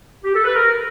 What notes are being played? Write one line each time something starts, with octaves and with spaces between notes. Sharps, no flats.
G4
A4
B4
A#4